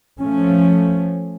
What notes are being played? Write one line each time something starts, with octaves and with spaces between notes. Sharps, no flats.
F3 A3 C#4